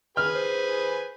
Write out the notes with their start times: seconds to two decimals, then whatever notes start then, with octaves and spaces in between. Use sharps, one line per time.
0.17 G#4 B4 G#5 F6
0.35 C5